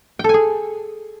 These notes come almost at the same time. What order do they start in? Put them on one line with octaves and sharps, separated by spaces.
G5 A4 G#5 G#4